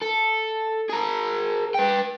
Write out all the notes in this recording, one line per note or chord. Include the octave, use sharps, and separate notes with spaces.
A4
G#4 A#4
B4 G5